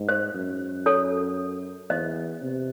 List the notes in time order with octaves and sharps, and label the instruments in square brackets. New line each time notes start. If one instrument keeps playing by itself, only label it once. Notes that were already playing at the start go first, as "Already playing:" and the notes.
Already playing: [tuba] G#2
[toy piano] C5
[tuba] F#2
[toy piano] A4 C#5
[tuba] E2 [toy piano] C5 D#5
[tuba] C3